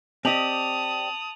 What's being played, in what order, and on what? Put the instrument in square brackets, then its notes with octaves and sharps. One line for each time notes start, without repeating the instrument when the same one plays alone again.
[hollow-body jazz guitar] C4 D#5 [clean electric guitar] G4 D5 [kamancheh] A5 D#6 [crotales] F7 F#7